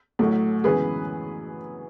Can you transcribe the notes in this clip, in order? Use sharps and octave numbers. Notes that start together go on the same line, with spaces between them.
A1 A2 F#3 A3
F#2 C#3 E3 G#3 B3 G#4 B4